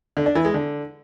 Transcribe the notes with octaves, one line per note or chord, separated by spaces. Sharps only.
D3
D4
E3
G#3
D3